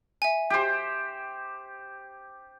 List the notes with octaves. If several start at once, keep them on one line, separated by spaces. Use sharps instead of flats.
E5 G#5
G4 C5